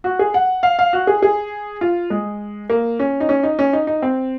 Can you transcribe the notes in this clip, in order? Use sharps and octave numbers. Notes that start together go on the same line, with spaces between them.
F#4
G#4
F#5
F5
F5
F#4
G#4
G#4
F4
G#3
A#3
C#4
D#4
C#4
D#4
C#4
D#4
D#4
C4